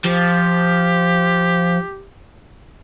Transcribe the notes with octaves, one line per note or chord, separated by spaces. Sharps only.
F3 G4